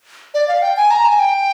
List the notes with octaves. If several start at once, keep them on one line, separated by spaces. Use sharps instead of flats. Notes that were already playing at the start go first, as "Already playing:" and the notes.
D5
F5
G5
G#5
A#5
G#5
G5